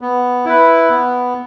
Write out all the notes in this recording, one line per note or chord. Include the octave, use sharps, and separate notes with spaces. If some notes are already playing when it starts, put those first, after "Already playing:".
B3
E4 B4
B3